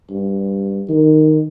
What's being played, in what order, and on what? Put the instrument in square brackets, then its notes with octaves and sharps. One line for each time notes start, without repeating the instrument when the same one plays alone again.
[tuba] G2
D#3